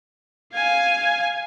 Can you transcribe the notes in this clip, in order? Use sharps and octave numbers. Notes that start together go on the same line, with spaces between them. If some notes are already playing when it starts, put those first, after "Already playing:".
F5 G#5